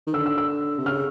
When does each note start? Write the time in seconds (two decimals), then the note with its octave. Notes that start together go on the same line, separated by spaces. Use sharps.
0.07 D#3
0.13 D3 E6
0.26 E6
0.38 E6
0.79 C3
0.86 C#3 F6